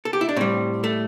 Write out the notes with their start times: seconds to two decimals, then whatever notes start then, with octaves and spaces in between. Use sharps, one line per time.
0.05 A4
0.13 G4
0.21 E4
0.29 D4
0.36 A2 G3 C4
0.84 A3